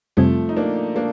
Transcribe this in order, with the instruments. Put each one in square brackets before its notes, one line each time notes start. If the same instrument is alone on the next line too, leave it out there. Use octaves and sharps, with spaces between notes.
[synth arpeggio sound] F2 C3 G3 C4 [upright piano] F3 A3
[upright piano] D#4
A#3 D4
A#3 D4